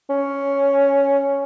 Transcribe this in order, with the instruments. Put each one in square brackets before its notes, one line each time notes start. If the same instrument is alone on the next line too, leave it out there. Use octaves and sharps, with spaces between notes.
[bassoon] C#4